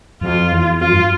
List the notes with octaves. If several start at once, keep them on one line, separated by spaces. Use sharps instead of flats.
F2 F4
E2
F2 F4
G2